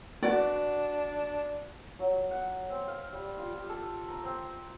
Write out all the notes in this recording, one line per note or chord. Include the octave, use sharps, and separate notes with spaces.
D4 F#4 B4 D5
F#3
F#5
C4
F5
G3
F4
G4
A4
A#5
C4